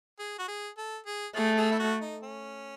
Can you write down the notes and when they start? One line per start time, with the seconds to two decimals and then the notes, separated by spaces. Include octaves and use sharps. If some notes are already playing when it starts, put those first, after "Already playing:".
0.19 G#4
0.39 F#4
0.48 G#4
0.77 A4
1.06 G#4
1.36 A3 G#4
1.57 G#4
1.71 E4
1.79 F#4
2.01 D#4
2.23 C#4